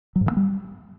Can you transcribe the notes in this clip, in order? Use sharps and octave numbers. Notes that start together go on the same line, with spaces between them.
F#3
G#2
D#3
A#3
G3